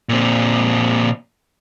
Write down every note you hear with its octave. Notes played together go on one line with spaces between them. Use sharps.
A#2 C4